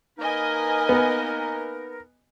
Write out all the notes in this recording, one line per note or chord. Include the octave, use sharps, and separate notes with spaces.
A#3 D#4 A#4 B4 D#5 G#5
B3